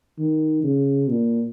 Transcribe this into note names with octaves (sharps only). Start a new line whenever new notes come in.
D#3
C#3
A#2